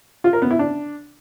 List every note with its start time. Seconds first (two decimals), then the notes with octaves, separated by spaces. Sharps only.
0.24 F4
0.33 A#4
0.42 B3
0.51 E4
0.59 D4